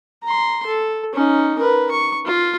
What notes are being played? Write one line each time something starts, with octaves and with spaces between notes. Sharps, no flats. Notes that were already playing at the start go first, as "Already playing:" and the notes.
A#5 C6
A4
C#4 D#4
A#4 B4
C#6
F4